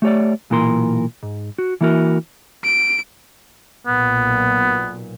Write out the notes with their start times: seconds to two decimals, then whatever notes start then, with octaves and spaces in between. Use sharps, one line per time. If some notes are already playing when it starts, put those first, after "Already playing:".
0.02 A3 G4 C#5 D5
0.50 B1 A#2 E3 A#4 C6
1.23 G#2
1.58 F#4
1.81 E3 A#3 E4 F#4 A#4
2.64 D7
3.87 B1 A#2 B3